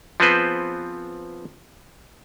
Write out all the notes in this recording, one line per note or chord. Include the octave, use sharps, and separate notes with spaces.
F3 B3 C4 G#4 B4 C5